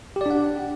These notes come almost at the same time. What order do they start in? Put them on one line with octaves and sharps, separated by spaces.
G4 D5 D4 F#5